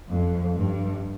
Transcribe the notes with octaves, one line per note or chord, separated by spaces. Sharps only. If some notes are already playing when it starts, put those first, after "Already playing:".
F2
G2